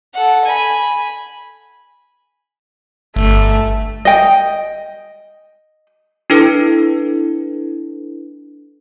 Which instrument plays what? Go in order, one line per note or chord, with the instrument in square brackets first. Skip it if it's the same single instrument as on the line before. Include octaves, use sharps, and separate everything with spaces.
[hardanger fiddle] A4 F#5
G#5 B5
[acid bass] G1 [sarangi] A3
[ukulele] D#5 G5
[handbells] D4 E4 A4 B4